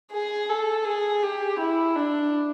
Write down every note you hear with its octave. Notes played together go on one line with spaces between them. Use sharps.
G#4
A4
G#4
G4
E4
D4